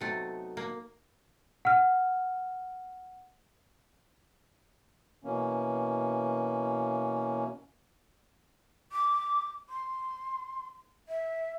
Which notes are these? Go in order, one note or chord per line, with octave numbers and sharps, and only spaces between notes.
C3 F#3 A3 B3 D#4
A#3
F#5 F6
B2 E3 A#3 C#4
D6
C6
E5